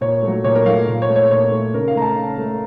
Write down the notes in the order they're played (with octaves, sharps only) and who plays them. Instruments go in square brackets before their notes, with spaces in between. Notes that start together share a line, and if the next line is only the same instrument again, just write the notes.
[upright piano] A#2 C#5
F#3 A3
A#2 C#5
A#4
F#3 A3 F5
A#2
C#5
A3
C#5
A#2 C#5
A3
C#3 A#4
F5
A3 A#5
A5
C#3
A3